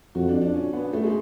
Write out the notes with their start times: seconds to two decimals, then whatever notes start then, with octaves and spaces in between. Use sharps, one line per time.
0.15 F2 F#4
0.29 D4
0.41 D4
0.54 C#4
0.73 B3
0.93 A3
1.03 G#3